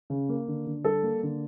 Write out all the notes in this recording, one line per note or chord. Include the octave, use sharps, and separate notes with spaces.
C#3
A#3
D3
D3
G3 A4
A#3
D3